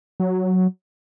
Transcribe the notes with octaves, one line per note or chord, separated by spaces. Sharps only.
F#3